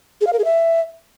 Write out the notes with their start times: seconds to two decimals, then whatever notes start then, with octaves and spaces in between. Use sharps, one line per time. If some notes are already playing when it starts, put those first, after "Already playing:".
0.21 G#4
0.27 F5
0.33 A#4
0.39 G#4
0.45 E5